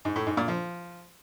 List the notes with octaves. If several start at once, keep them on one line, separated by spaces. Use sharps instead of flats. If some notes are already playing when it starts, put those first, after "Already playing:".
G#2
A2
G#2
A#2
F3